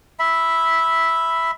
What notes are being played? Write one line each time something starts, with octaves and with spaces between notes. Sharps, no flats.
E5 B5